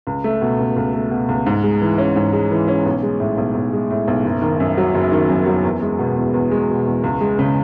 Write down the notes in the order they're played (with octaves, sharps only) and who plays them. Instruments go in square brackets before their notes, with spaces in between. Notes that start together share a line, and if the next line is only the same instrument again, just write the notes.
[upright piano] C#2
A3
B2
C#2
C#2
A3
B2
C#2
G#2
G#3
E3
C#4
G#2
G#3
E3
C#4
B1
G#3
A2
B1
B1
G#3
A2
B1
F#1
D#3
F#2
F#3
F#1
D#3
F#2
F#3
E2
G#3
B2
E2
E2
G#3
B2
E2
C#2
G#3
C#3